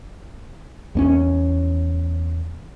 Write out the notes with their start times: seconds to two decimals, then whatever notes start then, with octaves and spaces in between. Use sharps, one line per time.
0.95 E2 A#3 C#4